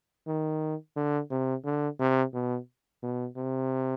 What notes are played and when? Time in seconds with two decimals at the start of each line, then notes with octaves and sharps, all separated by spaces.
0.27 D#3
0.96 D3
1.31 C3
1.64 D3
1.99 C3
2.34 B2
3.03 B2
3.36 C3